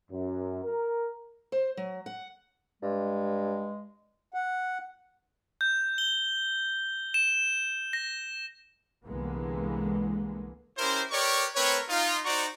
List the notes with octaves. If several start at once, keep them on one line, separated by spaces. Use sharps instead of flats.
F#2
A#4
C5
F#3
F#5
G2 G#3
F#5
G6
G7
E7
A#6
C2 D3 E3 G#3 A#3 B3
C#4 E4 G4 A#4 C5
G4 A#4 B4 C#5 D5 C#6
A3 C4 A#4 B4 C#5
D#4 F4
D#4 F#4 C5 D5 A#5 C#6